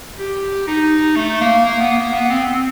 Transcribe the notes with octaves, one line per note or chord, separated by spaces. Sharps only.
G4
D#4
A3
A#3
A#3
B3
A#3
B3
C4
C4